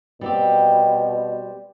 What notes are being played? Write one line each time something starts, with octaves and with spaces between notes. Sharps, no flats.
B2 G3 C4 G4